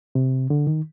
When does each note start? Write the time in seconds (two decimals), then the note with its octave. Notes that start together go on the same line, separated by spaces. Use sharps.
0.15 C3
0.50 D3
0.67 D#3